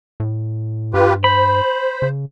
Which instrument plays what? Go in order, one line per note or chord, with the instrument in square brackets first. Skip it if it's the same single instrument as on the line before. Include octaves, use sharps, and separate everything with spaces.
[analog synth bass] A2
[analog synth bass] G2 [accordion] F4 G4 B4
[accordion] C5 [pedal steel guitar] B5
[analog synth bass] C#3